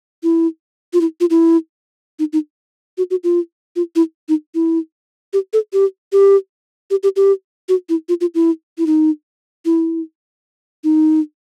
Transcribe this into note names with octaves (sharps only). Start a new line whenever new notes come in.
E4
F4
E4
F4
E4
D#4
D#4
F#4
F#4
F4
F4
E4
D#4
E4
G4
A4
G4
G4
G4
G4
G4
F#4
E4
F4
F4
E4
E4
D#4
E4
D#4